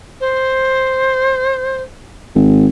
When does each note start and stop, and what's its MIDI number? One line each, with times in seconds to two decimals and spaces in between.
0.20 1.82 72
2.35 2.67 32